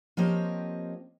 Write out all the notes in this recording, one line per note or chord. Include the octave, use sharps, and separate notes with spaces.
F3 A#3 C4 G4 C#5 D#5